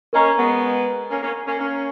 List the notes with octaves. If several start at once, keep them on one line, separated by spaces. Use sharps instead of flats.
A#3 C#4 A#4 D#5 A#5 C#6
G#3 B3
A#3 C#4
A#3 C#4
A#3 C#4
A#3 C#4